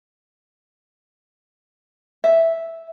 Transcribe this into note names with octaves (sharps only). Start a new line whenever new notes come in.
E5